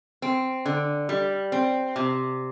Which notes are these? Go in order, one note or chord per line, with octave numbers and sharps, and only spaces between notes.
C4
D3
G3
C4
C3